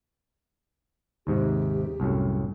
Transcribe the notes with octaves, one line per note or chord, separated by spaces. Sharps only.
D#2 G#2 C3 G4
C2 F#2 A2